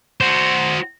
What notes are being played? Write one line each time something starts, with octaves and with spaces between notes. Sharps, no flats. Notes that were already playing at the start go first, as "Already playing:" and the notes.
F#4 C5